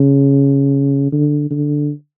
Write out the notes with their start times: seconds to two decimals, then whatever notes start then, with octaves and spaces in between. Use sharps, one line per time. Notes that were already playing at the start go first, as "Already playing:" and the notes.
Already playing: C#3
1.12 D3
1.51 D3